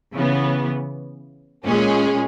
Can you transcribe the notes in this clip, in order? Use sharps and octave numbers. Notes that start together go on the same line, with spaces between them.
C#3 E3 B3
A#2 G#3 C#4 G#4